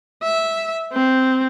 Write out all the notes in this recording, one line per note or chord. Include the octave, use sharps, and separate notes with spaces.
E5
C4